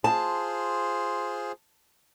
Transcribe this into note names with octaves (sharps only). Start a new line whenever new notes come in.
F4 G#4 C5 A5